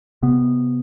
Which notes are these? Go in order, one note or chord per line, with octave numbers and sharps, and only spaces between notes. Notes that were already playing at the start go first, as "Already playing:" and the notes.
C3 B3